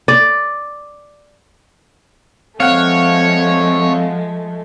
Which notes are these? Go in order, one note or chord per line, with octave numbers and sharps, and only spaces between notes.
D5
F3 G#3 A3 C4 C#5 F5 F#5